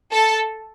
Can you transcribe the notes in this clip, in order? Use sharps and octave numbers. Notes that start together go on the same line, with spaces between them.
A4